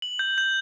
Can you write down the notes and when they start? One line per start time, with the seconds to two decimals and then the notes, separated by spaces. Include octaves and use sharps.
0.02 F#7
0.19 G6
0.38 G6